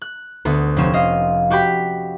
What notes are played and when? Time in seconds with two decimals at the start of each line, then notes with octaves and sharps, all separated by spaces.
0.02 F#6
0.45 D2 B3
0.76 F1 C4 C#4 E7
0.94 D#5 F5
1.50 F#4 G4 G5 B5 B6